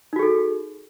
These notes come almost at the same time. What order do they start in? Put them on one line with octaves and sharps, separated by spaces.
D#4 F#4 G#4 A4